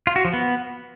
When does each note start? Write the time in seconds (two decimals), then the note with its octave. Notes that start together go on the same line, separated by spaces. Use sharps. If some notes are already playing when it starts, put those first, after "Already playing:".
0.07 F4
0.16 F#4
0.25 F3
0.33 B3